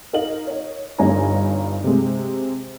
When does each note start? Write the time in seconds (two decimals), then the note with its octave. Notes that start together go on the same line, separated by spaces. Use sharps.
0.13 D#4 A#4 D#5 F5 F#7
0.47 C#5 D#5
0.98 G1 G2 D#4 C#5 G#5 A#5
1.84 C3 G#3